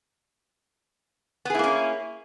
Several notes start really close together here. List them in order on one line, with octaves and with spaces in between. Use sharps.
B3 G#4 E4 A#3 C#4